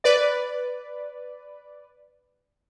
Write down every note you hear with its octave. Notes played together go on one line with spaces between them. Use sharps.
B4 D5